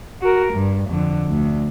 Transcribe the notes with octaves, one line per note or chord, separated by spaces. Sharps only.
F#4 A#4
G2
F2 D3
D2